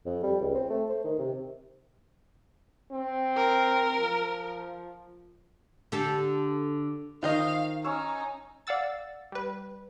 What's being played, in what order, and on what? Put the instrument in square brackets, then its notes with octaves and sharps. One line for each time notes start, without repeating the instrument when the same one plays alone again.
[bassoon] F2
G3
C#2
C4
A3
C5
D#3
C3
[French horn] C4
[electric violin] A#4
[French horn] F3
[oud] D3 G4 A4
[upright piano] D#3 [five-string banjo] F4 C5 D#5 [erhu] F5
[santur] C#4 C#5 E6 [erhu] D#4
[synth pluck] D5 F5 F#5 E6 A6
G3 B4